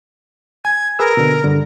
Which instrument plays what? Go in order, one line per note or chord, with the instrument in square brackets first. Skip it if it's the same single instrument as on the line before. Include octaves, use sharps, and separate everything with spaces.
[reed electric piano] G#5 [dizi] G#6
[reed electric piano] G#4 B4 E6 [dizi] A#4
[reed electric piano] B2 D3
G2 D3